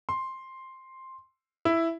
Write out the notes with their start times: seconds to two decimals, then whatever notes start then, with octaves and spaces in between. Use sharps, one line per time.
0.09 C6
1.65 E4